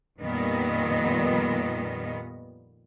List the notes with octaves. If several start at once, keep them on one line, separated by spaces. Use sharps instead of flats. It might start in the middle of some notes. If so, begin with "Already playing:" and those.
F2 A#2 D#3 G3 B3 D#5